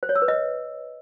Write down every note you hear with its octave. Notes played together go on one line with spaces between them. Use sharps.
C5
C#5
E6
B4
D#5